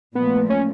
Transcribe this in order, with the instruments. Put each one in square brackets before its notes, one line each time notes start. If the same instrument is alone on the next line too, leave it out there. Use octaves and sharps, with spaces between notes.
[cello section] A#2 F3 A3 [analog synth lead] B3
[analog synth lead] C#4